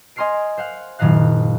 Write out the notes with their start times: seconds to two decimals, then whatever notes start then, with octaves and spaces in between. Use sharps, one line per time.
0.16 D#5 G#5 C6 F6 C7 D7
0.57 C5 F5 F#5
0.99 F#1 A#2 D#3 D#5 F5 F#6